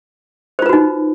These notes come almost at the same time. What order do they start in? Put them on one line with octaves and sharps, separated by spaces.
C5 F4 B4 F#4 D#4